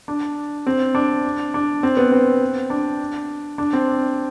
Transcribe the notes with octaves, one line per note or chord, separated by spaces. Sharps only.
D4
C4
D4
D4
C4
B3
C4
D4
D4
C4